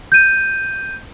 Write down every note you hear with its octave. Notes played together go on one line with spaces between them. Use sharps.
G6 D#7